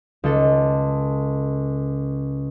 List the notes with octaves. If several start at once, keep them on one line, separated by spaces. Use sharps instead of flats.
C#2 A4